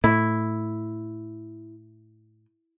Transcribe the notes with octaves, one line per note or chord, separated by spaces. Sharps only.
A2 E4